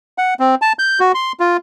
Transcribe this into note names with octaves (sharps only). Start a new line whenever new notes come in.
F#5
C4
A5
G6
F#4
C6
F4